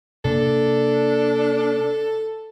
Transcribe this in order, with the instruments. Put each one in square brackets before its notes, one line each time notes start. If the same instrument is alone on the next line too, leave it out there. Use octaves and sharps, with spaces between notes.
[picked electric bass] C3 A#3 [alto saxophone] D4 [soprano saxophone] A4